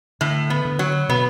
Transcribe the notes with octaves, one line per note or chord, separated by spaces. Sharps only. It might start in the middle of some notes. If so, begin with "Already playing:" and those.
A2 D3
B3
D3
F#3
B2 B3